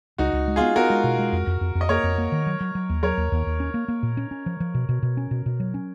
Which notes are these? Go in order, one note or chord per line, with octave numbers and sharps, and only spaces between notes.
C#2 D#4 F#4
C#2
G#3
B3 F4 G#4
B3 F#4 A#4
G#3
B2
G#3
F2
F2
F2
F2
D#5
A#3 A#4 C#5
F2
A#3
D#3
F#3
F#3
F#3
D#2
F#3 A#4 C#5
D#2
D#2
D#2
C#4
A#3
A#3
A#2
C#4
C#4
F3
F3
B2
B2
B2
C#4
B2
B2
F#3
C#4